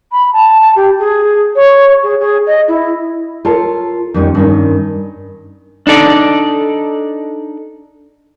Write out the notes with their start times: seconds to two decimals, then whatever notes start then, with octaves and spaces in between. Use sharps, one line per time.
0.12 B5
0.33 A5
0.61 A5
0.76 G4
0.99 G#4
1.55 C#5
2.03 G#4
2.20 G#4
2.47 D#5
2.68 E4
3.45 F4 A4 A#4 C#5 A5
4.14 F2 D#3 G3 B3 C#4
4.35 G2 D#3 C#4
5.87 D4 D#4 A4 D5